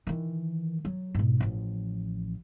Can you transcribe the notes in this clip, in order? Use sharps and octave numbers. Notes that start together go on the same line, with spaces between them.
D#3 E3
F#3
G#2 B2
A1 F3